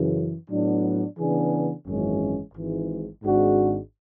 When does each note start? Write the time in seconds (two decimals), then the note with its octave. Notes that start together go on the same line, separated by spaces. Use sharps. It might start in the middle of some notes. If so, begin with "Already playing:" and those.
Already playing: F#2 C#3 E3
0.49 A2 F#3 B3 D4
1.18 C#3 E3 B3 D4 G#4
1.87 G#1 F#2 E3 G#3 C#4
2.54 G#1 G#2 E3
3.23 G#1 G#2 G#3 D4 F#4